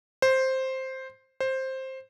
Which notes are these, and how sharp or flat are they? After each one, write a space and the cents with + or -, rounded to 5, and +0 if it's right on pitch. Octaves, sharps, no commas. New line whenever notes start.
C5 +5
C5 +10